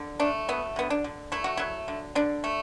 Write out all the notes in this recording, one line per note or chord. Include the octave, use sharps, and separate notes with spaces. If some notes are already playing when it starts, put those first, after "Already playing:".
Already playing: D3
A3 D4
F#3 B3
D3 B3
D4
D3
A3 E4
F#4
F#3 E4
D3
D3 D4
A3